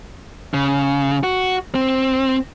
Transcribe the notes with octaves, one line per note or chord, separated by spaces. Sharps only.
C#3
F#4
C4